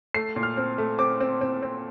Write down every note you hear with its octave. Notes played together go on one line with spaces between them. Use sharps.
A3 C7
A#2
F6
C4
A3
C4 D6
C4
C4
C4